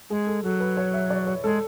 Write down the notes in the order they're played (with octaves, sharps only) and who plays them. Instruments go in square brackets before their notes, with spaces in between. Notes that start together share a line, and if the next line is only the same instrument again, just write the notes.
[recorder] G#3 [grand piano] G#4
[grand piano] A4
[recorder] F#3 [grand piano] A4
[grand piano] B4
C#5
E5
D5
C#5
[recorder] G#3 [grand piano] A4